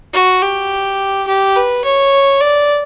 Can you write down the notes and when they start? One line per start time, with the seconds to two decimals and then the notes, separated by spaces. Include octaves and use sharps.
0.13 F#4
0.43 G4
1.28 G4
1.56 B4
1.85 C#5
2.41 D5